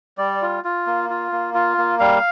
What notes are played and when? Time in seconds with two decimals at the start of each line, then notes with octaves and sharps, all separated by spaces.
0.18 G3 D5
0.42 F4
0.64 F4
0.87 A#3
1.10 F4
1.32 A#3
1.54 F4
1.78 A#3
2.00 G3 F5